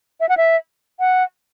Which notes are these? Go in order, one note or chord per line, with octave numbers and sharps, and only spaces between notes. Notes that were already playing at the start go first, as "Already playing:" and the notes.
E5
F#5
E5
F#5